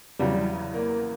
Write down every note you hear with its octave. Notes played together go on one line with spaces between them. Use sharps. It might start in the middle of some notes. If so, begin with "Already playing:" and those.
E2 C#3 F#3 G3
A#3